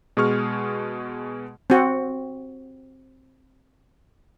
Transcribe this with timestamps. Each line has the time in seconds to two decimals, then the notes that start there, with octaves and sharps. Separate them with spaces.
0.17 B2 G#3 G#4 C#6 F6
1.70 C4 F#4